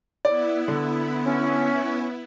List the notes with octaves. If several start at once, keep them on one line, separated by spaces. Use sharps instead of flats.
B3 E4 D5
D3
C#4